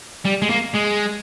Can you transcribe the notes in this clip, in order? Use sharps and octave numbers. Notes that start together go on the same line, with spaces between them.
G3
G#3
A#3
G#3